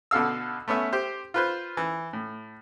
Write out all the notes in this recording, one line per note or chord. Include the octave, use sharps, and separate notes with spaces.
B2 D3 A4 F5 E6
A3 B3 C#4 E5
G4 C5
F4 B4 C5
E3
A2